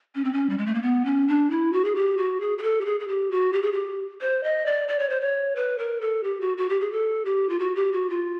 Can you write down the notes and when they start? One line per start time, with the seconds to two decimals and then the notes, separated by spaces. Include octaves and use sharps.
0.15 C#4
0.24 C4
0.33 C#4
0.50 G3
0.58 G#3
0.66 A3
0.74 A#3
0.82 B3
1.05 C#4
1.28 D4
1.50 E4
1.73 F#4
1.85 G#4
1.95 G4
2.18 F#4
2.41 G#4
2.58 G#4
2.63 A4
2.81 G4
2.85 G#4
3.00 G#4
3.08 G4
3.31 F#4
3.53 G4
3.62 G#4
3.73 G4
4.21 C5
4.44 D#5
4.66 D5
4.88 D5
4.99 C#5
5.10 C5
5.21 C#5
5.56 B4
5.79 A#4
6.01 A4
6.24 G4
6.41 F#4
6.58 F#4
6.69 G4
6.81 G#4
6.92 A4
7.25 G4
7.49 F4
7.59 F#4
7.76 G4
7.93 F#4
8.10 F4